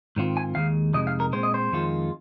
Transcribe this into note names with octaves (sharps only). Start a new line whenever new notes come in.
G#2 D#3 C4 F4
G#5
D#2 D#3 G#3 F5
F2 C3 G#3 D#4 D#5
F5
A#4
A#2 G#3 C4 C5
D#5
C5
F2 D#3 G#3 F4